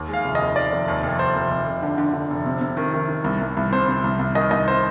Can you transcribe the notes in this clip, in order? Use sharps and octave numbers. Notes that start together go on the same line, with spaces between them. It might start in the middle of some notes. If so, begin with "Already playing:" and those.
Already playing: D#2
G#3
F5
F1
D#5
D#2
D#2 D5
F1
D#2
F1
D#2 C5
F1
F1
F1
D3
D3
D3
F1
C3
C3
D#3
D#3
D#3
C2
C2
C2
C3 C5
C3
C2
C2
D#3 D#5
C2 D#5
C5